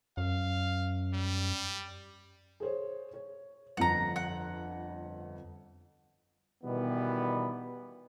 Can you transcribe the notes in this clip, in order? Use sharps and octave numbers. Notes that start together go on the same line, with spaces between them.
F#2 F5
G3
G#4 C5 C#5
C#5
G1 F2 F#5 A#5
F#5
B2 D#3 E3 G3 B3